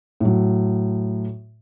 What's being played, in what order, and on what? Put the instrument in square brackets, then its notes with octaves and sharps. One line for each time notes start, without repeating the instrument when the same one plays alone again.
[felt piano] A2 F#3